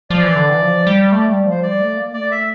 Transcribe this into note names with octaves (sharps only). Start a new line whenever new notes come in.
F3 D5
E3
D3
E3
F3
G3
A3 D5
G3
F3
C5
G3 D5
A3
A#3
A3 D5
E5